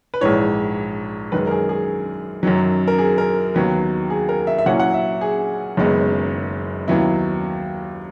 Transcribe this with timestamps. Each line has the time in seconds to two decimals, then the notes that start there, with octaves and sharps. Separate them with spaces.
0.14 B4
0.21 A#1 G#2 E3 C#5
1.32 F#2 D#3 G#3 B4
1.47 A#4
1.51 G#4
1.69 G#4
2.43 F#2 D#3 F#3
2.88 A#4
2.98 G#4
3.18 A#4
3.55 D#2 D#3 F#3 B3
4.10 G#4
4.29 A#4
4.47 E5
4.58 E5
4.66 A#2 F#3 C#4 E4 F#5
4.80 F#5
4.94 E5
5.21 G#4
5.77 F#1 F#2 D#3 G#3 B3
6.88 D#2 D#3 F#3 B3 E4